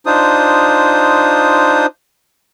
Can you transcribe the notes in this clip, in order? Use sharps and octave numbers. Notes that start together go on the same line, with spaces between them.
D4 D#4 F4 C5 D#6